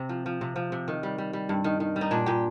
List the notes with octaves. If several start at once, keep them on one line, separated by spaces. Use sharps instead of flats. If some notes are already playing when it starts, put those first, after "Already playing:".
Already playing: C3 C4
F3
F3
C3
F3
C3
D#3
G3
G3
G3
G2
D#3
D#3
G3
D#4
A#2 D4
A#2 G4